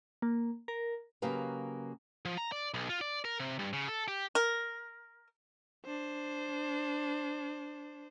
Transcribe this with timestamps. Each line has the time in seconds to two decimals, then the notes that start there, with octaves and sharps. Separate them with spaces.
0.22 A#3
0.68 A#4
1.22 C#3 F#3 A#3 G4 B4 F5
2.25 F3
2.38 A#5
2.52 D5
2.74 B1
2.89 F4
3.01 D5
3.25 A#4
3.40 C3
3.59 G2
3.73 C#3
3.88 A4
4.08 G4
4.35 A#4
5.85 D4 C5